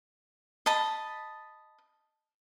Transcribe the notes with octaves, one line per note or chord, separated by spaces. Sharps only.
D#5 A5 B5